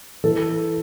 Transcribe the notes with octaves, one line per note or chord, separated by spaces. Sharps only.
E3 A4